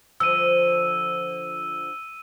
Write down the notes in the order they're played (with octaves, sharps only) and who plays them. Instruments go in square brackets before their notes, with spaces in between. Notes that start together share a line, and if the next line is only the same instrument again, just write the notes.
[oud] D3 F3 [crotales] E6 D#7